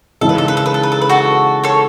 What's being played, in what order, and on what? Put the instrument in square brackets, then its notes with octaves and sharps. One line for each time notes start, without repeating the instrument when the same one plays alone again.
[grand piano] C#3 E3 G#3 D#4 [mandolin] A4
[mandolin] B4
A4
B4
A4
B4
A4
B4
A4
B4
F#4 A4
A4 C#5